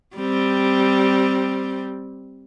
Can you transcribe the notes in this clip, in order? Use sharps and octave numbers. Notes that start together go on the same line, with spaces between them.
G3 C4